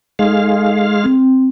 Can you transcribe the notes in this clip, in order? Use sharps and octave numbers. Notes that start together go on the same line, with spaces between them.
G#3 D#4 A4 F5
C4